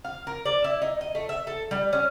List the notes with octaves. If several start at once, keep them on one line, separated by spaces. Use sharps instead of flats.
F5
A#4
D5
E4
D#4
D#5
A3
E5
A4
G3
C#4